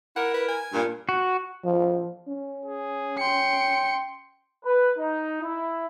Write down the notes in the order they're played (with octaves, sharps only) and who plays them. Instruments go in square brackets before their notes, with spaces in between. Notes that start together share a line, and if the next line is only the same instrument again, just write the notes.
[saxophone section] E4 A#4 [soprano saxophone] F#5
[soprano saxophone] B4
G#5
[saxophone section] G2 A#2
[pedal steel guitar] F#4
[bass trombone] F3
C#4
[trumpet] G#4
[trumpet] G5 [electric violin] C6 C#7
[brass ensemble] B4
D#4
E4